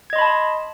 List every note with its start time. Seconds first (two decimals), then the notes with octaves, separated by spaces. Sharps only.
0.10 G#6
0.13 D#5
0.16 C6
0.18 B5
0.21 A5